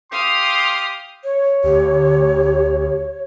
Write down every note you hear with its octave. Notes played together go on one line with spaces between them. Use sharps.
G4 F5 C6 D#6
C#5
D2 G4